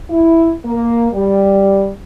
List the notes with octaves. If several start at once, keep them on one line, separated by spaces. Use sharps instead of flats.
E4
A#3
G3